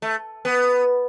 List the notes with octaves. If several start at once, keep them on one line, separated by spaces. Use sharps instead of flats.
A3
B3